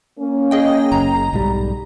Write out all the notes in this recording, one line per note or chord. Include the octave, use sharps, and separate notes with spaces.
A#3 C#4
G#4 D#5 G5
F#1 A#5
B1 G#2 G3